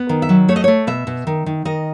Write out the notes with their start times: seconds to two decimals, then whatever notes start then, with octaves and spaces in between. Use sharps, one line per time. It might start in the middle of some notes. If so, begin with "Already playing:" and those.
Already playing: B3
0.09 D#3
0.22 E5
0.29 F#3
0.48 A3 C#5
0.56 D#5
0.64 A3 C#5
0.87 B2 E5
1.07 B2
1.27 D#3
1.46 D#3
1.65 D#3 D#5